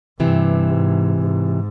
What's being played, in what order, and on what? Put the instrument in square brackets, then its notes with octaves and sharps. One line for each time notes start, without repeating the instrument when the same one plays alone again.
[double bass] G2 [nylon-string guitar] C3 E3
[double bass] G#2
G#2